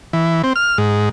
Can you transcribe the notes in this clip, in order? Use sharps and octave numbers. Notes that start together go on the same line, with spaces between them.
E3
C4
F6
G#2